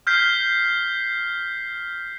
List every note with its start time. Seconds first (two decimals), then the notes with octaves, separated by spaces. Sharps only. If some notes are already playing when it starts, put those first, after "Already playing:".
0.07 F6 G6 B6 C7